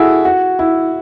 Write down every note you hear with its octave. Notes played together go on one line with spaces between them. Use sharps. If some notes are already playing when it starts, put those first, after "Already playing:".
Already playing: E4 F#4 G#4 A4
F#4
E4